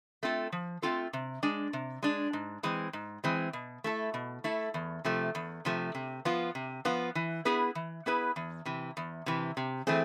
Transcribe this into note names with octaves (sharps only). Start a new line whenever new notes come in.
A3 C4 F4 A4
F3
A3 C4 F4 A4
C3
G#3 D4
C3
G#3 D4
G#2
E3 G#3 C4
G#2
E3 G#3 C4
B2
A3 E4 A4
B2
A3 E4 A4
E2
C3 F3 A3
E2
C3 F3 A3
C3
F3 B3 F4
C3
F3 B3 F4
E3
B3 E4 G#4 B4
E3
B3 E4 G#4 B4
E2
C3 E3
E2
C3 E3
C3
E3 A3 C4 G#4